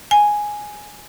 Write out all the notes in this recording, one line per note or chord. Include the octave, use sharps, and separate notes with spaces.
G#5